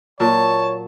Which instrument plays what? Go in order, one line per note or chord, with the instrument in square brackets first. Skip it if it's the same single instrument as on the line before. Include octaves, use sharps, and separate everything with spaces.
[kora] A#2 F#3 [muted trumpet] C#5 [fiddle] A5